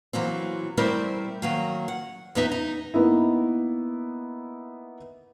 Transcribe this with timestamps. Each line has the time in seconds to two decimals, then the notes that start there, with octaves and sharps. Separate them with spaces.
0.13 E3 F#3 A#3 C4
0.77 G3 A3 C4 E4 A#4 C5
1.42 D#3 F#3 A#3
1.88 F#5
2.35 E2 B3 D#4 E5
2.52 D#4
2.94 A#3 B3 D#4 E4